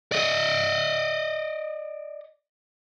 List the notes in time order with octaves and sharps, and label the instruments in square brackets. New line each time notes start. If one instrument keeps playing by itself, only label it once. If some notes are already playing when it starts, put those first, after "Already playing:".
[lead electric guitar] D5 D#5